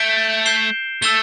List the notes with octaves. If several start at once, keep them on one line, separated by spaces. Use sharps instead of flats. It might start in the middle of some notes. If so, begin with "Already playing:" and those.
Already playing: A3 G6 D7 G7
G6 C7 E7 G7
A3 E6 A6 E7 G7